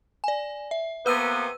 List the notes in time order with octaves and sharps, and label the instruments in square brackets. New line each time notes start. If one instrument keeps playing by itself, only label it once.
[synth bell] D5 G#5
E5
[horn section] C3 A#3 B3 [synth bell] B4 E6 D#7